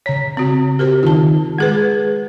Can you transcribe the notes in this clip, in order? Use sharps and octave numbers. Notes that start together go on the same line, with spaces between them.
C#3 C#5 A#5 B6
C4 F#4
G4 A#4 C5
D#3 D#4 F4 A5
G#3 G#4 B4 G#6